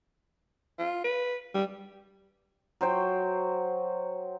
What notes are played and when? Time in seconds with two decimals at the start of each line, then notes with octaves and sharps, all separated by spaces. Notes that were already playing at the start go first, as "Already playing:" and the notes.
0.79 F4
1.04 B4
1.54 G3
2.81 F#3 C5 G5